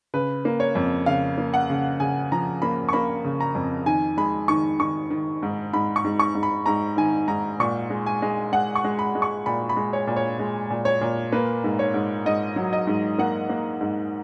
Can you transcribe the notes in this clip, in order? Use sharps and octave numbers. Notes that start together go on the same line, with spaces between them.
C#3 B4
A#3
C#5
F2
C#3 F5
A#3
F#5
C#3
C#3 G#5
F3 A#5
A#3 B5
C#6
A#3 B5
C#3
A#5
F2
D#3 G#5
G#3 B5
D#3 C#6
D#3 C#6
D#3
G#2
G#2 B5
C#6
G#2
C#6
G#2
B5
G#2 A#5
D#3 G#5
G#2 A#5
A#2 C#6
G#3
G#5
G#3
G#3 F#5
C#6
G#3
B5
G#3
C#6
A#2 B5
B5
G#3
C#5
A#2
C#5
G#3
A#2
C#5
A#2
A#3 B4
G#2
C#5
G#2
G#2 D#5
F#3
D#5
G#2
A#3 F#5
A#3
G#2